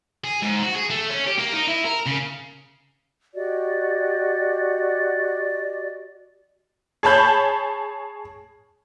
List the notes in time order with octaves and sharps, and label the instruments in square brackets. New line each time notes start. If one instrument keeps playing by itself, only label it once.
[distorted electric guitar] G#4
G#2
F#4
G#4
A3
C#4
G4
A#3
D#4
E4
A#4
C#3
[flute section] F#4 G4 D5 D#5
[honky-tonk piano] G#4 C#5 A5 B5 G6